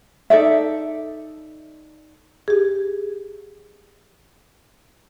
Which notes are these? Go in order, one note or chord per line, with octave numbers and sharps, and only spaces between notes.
D#4 A4 D5 E5
G4 G#4